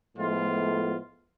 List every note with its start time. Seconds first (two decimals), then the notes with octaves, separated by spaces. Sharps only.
0.18 A2 F3 G#3 A3 B3 F4